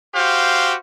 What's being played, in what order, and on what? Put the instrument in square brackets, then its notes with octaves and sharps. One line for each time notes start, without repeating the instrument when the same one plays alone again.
[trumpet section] F#4 G4 C5 F5